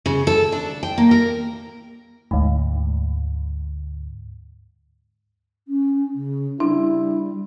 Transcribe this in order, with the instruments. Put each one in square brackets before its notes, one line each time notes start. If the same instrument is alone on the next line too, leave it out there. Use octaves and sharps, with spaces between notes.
[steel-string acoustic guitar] C#3
A4
D4
G5
A#3
A#4
[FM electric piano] D2 G#2
[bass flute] C#4
C#3
[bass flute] G3 [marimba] D4 [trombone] E4